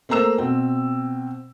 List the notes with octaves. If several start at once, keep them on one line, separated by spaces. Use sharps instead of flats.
A3 A#3 C5 A#5 E6 E7
B2 C4